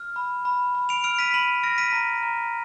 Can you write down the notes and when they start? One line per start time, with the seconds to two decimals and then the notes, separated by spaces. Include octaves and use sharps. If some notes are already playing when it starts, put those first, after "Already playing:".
Already playing: F6
0.16 B5
0.45 B5
0.75 B5
0.89 D7 F7
1.04 F6 D7 F7
1.19 B6 D#7
1.34 B5 D#7 F#7
1.63 F6 A#6 D7
1.78 B6 D#7
1.93 A#5
2.23 A#5